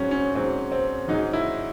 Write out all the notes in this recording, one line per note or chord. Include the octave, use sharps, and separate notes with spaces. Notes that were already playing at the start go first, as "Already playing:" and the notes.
Already playing: G#2 F#3 C4 C#4
C#4
G#2 F#3 C4
C4
G#2 F#3 D#4
E4